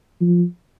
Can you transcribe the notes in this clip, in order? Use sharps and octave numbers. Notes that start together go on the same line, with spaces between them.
F3